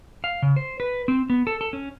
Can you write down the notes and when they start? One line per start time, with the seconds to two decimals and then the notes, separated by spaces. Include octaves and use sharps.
0.24 F5
0.42 C#3
0.56 C5
0.80 B4
1.08 C4
1.30 B3
1.47 A4
1.61 A4
1.73 C#4